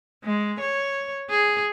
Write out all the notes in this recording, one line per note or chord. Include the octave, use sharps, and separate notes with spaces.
G#3
C#5
G#4